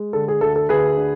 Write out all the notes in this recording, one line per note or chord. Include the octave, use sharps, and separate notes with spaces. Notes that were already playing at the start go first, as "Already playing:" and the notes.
Already playing: G#3
D3 A4
G#4
D2 A4
A4
D2 G#4 B4
D3